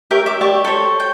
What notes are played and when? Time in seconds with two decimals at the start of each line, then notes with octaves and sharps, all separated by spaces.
0.11 G4 A#4 C#5 E5
0.26 E5 D6
0.41 G4 D5 C#6 D6
0.64 A4 C5 C#5
1.00 G5